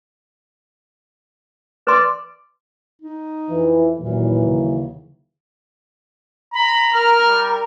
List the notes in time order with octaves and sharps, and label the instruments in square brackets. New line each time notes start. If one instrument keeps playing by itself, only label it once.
[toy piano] B4 C6 [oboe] D5
[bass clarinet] D#4
[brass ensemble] F2 E3
[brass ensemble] D#2 E3 F#3 [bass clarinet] A#2
[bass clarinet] C#3
[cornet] A#5 [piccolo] B5
[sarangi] A#4 [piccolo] F6
[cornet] G3